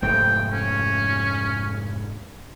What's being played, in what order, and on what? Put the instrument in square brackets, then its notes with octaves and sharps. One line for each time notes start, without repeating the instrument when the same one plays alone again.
[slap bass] F1 G#2 A3 [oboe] G5
[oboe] C#4